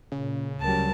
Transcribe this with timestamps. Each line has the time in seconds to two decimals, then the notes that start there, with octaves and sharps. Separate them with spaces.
0.12 A#2 C#3
0.61 D2 F#3 G3 A#4 A5